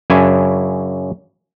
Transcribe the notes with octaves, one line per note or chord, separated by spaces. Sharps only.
F#2 C#3 D4 E4 G#5